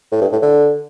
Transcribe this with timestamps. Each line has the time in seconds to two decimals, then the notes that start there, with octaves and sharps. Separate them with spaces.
0.12 A2
0.22 G2
0.32 A2
0.43 D3